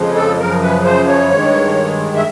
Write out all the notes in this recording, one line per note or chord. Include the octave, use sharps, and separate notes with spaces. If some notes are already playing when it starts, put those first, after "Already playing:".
Already playing: F2 C#3 F3 G#3
A4
F#2 C#3 F3 A#4
B4
C5
C#5
G2 D#3 G#3
E5